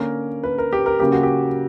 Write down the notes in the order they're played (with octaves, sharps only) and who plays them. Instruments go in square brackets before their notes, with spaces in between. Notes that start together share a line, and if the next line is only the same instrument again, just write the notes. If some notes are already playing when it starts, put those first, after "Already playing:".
Already playing: [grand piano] D3 A#3 C#4 A#4
B4
A#4
G4
A#4
C#3 F#3 A#3 C#4 G4
F#4
G4